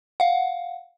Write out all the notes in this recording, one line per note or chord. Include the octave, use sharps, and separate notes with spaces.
F5 F#5